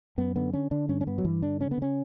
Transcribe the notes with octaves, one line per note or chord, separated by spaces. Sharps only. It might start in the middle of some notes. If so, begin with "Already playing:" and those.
F#2 B3
D3 B3
D3 C#4
D3 D4
G2 C#4
C#4
G2 B3
F#3
G2 E3
D3 D4
C#3 C#4
B3
C#3 C#4